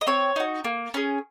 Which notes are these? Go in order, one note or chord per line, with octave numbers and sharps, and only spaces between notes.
D#5
C4 C#5
D#4 F#4
A#3
C#4 G#4